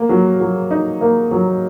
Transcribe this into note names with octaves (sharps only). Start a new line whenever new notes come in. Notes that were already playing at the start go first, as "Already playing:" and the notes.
Already playing: A#3
F#3
F#3
D#4
A#3
F#3